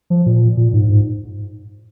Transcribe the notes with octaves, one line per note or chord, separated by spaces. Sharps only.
F3
A#2
A#2
G#2
G#2